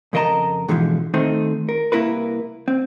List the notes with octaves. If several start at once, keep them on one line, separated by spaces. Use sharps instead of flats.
F2 C#3 A#4 D#5 A5 A#5
G#2 B2 D3 E3 F3
D#3 A3 C4 D#4
A#4
C2 A#3 E4 A#4 B4
C4